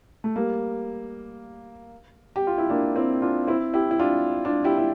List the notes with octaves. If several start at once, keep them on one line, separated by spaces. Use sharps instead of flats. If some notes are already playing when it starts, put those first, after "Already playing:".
A3
G3 A#3
G4
F4
E4
A#3 D4
C4 E4
D4 F4
C4 E4
E4 G4
E4
D4 F4
D4 F4
E4 G4
E4